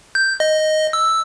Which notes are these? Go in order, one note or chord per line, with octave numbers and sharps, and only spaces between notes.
G6
D#5
E6